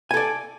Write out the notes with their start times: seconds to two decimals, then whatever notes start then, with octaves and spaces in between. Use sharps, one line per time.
0.11 G#5
0.14 A4
0.17 D5